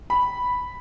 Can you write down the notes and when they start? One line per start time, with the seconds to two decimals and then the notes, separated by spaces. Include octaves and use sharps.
0.10 B5